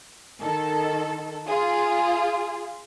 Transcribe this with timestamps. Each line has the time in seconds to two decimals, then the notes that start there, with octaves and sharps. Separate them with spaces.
0.41 D#3 A4
1.47 F4 G#4